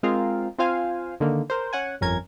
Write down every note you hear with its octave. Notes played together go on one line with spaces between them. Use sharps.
G#3 C4 F4 G#4 A#4 F5
C4 F4 C5 F5 G#5
D3 D#3 A#3
A#4 C5
C#4 F#5 G#5
G1 F2 C#4 A#4 G#6